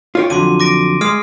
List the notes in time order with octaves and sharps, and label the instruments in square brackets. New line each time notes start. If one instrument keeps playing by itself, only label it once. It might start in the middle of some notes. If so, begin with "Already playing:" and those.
[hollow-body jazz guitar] F4 C#5 G5
[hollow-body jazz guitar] F2 D3 F#3 [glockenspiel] C6 D6 D#7
[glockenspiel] D6 A#6 D7
[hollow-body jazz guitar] G#3 [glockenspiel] D#6 F6 C7